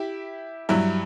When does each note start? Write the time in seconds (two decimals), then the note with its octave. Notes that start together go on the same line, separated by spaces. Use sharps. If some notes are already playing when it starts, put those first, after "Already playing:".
Already playing: E4 G4
0.69 G2 F#3 E4